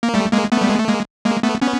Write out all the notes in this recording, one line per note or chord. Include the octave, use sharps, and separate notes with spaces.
A#3
G3 A3
G#3 A#3
A3 B3
G3
G#3
A3
G#3 A#3
G#3 A#3
A3 B3
B3 C#4